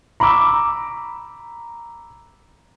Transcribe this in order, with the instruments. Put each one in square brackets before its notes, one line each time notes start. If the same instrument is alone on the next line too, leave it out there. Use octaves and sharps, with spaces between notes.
[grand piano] A#5 B5 C#6 D6 E6